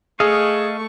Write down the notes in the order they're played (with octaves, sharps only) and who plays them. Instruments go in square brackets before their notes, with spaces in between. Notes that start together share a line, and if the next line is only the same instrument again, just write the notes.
[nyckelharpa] A3 C#6 [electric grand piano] G#4 [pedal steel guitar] A4 D#5 F5